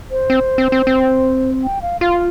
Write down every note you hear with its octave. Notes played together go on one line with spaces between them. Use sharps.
C5
C4
C4
C4
C4
G5
F5
F4 F5